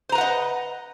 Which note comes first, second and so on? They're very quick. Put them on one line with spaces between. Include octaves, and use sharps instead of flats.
C5 A#5 B4 F#5 D#5